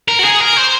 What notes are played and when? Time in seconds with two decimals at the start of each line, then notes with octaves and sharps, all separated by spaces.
0.08 A#4
0.19 F#4
0.24 G#4
0.40 A#4
0.57 C5